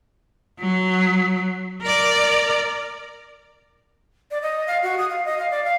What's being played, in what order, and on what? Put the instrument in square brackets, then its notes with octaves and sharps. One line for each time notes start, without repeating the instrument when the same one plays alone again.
[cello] F#3
A#4 D5
[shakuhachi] D5
D#5
F5
F#4
D#6
F5
D#5
F5
D5
F5